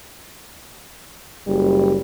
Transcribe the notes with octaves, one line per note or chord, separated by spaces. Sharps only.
F#1 G3